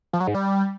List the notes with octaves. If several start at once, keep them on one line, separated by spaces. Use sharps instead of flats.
F3
F#3
G#2
G3